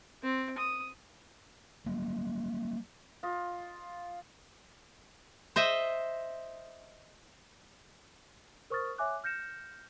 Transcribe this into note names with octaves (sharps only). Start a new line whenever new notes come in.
C4
D#6
F#3 G3 A#3
F4 D#5
C5 D#5 E5
A#4 C5 C#6 D#6 F6 A6
C#5 E5 G#5 D6 F#6
F6 G6 A#6 C#7 E7